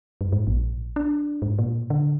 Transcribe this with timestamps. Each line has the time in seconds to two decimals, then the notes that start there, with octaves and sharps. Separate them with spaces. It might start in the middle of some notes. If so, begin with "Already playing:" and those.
0.21 G2
0.32 G#2
0.47 A#1
0.96 D4
1.42 G#2
1.59 A#2
1.90 D3